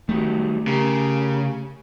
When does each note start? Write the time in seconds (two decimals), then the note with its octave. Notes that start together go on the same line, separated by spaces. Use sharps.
0.09 D#3 F#3 G3 A3
0.67 C#3 G4 A#4